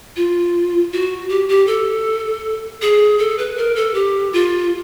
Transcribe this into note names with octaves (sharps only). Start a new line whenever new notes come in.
F4
F#4
G4
G4
A4
G#4
A4
B4
A#4
A4
G4
F4